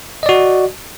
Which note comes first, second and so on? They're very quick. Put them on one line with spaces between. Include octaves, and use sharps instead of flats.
D#5 D5 F#4